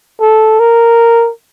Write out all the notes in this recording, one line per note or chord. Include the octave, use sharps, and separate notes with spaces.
A4
A#4